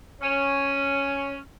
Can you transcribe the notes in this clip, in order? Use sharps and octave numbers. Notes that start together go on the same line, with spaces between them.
C#4